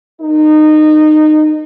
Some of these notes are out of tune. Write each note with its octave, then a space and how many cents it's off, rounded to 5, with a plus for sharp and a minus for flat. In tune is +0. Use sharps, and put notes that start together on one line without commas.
D#4 -20 A#4 +0